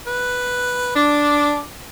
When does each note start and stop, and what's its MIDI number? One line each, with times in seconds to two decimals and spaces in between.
0.07 0.92 71
0.96 1.61 62
0.96 1.62 86